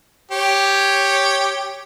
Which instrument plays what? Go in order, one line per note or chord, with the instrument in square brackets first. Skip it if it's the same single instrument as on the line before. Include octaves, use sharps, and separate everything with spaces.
[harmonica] G4 C#5